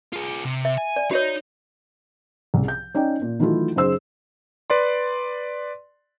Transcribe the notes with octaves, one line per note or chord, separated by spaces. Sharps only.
F4 G#4
C3
E5
G#5
D5
D#4 F#4 C#5 D#5
C2 C#3
G6
C#4 D#4 D5 G5
A#2
D#3 E3 F#3 A3 E4 F4
F#2 C#3 D#4 G#4 C5 E6
B4 D5 C6